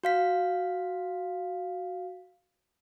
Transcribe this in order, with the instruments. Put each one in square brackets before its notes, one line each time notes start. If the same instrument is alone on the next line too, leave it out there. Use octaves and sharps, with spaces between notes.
[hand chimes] F#4 F5 B6